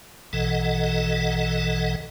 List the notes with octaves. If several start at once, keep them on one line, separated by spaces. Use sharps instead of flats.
A#1 B2 E3 A4 D#5 F#5